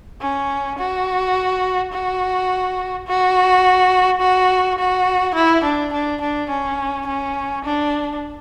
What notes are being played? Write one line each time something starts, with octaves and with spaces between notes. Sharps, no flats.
C#4
F#4
F#4
F#4
F#4
F#4
E4
D4
D4
D4
C#4
C#4
D4